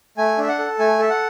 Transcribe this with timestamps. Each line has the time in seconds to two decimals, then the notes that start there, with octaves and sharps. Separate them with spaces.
0.18 A3 G#5
0.38 D4 E5
0.48 F#5
0.59 A4
0.79 A3 G#5
0.99 A4 E5
1.10 F#5